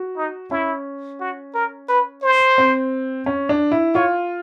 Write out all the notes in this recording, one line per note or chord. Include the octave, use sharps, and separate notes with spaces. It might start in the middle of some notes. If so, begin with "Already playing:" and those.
Already playing: F#4
D#4
C#4 E4
F#4
A#4
B4
C5
C4
C#4
D4
E4
F4 C#5